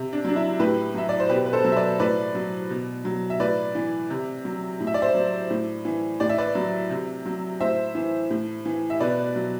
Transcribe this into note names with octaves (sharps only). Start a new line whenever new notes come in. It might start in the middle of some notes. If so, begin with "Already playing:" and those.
Already playing: C3
D4
F#3 D4
E4
A2 G4 B4
F#3 E5
D5
C5
B2 G4 B4
B4
A4 C5
F#3
E5
B4 D5
A2 B4 D5
F#3
B2
F#3
E5
A2 B4 D5
E3
C3
F#3
A2
E5
D5
C5 E5
F#3
A2
E3
A2 D5
E5
B4 D5
F#3
C3
F#3
A2 C5 E5
E3
A2
E3
E5
B2 B4 D5
F#3